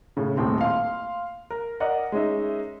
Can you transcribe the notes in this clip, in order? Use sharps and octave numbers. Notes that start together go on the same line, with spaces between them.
A2 C#3
D#1 A2 C4
F5 C6
A#4
A#4 D5 D#5 F#5
G#3 C#4 D#4 E5